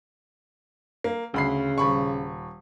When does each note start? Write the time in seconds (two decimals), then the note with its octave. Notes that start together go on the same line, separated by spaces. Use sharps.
1.04 A#3
1.34 D2 C#3 B5 C7
1.78 D#1 B5 C#6